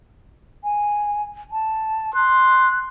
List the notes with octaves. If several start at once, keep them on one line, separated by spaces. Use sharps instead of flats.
G#5
A5
C6 F#6